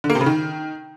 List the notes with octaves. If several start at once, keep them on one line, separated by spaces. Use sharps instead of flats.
D3
A#3
C3
C#3
D#3